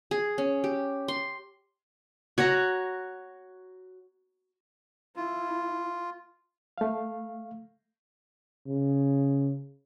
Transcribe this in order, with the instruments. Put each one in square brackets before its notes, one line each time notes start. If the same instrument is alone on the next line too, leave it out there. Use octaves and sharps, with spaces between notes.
[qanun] G#4
C#4
G4
C6
F#4 C#5 F#5 A#5
[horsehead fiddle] E4 [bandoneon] F4
[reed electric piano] A3 F5
[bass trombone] C#3